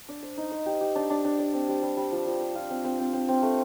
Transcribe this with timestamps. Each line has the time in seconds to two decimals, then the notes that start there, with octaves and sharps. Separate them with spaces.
0.09 D4
0.23 C5
0.37 D#4
0.51 C5
0.66 G4
0.81 G4
0.95 D4
1.10 D4
1.25 D4
1.39 D5
1.54 C4
1.69 G3
1.82 G3
1.97 G3
2.12 F3
2.26 F3
2.41 C5
2.55 F4
2.70 C4
2.85 C4
2.99 C4
3.13 C4
3.28 C4
3.43 A3